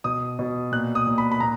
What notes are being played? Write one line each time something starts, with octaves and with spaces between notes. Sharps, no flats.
B2 D#6
B2
A#2 F#6
D#6
A#2
B5
B5
A#2 A#5